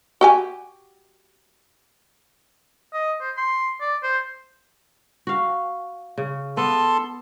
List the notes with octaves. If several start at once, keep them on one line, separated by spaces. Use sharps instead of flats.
F#4 G4 G#5
D#5
C5
C6
D5
C5
F#4 F5
C#3
B3 A4 A5 C6